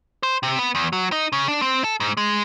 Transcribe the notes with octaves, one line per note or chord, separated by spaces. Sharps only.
C5
C3
B3
E2
F#3
D#4
C#3
D4
C4
A4
G#2
G#3